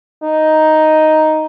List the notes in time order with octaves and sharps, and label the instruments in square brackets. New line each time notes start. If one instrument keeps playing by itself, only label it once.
[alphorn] D#4